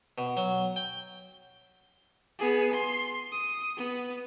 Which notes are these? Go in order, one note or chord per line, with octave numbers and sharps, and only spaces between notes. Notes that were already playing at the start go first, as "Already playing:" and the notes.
B2
F#3
G5
B3 G#4
C6
D#6
B3